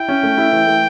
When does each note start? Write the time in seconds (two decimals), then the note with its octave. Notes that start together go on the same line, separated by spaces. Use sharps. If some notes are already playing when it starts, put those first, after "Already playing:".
Already playing: E4 G5
0.08 C#4
0.23 A3
0.38 E4
0.52 E3
0.67 A3